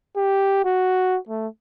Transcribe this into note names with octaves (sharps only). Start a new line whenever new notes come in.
G4
F#4
A3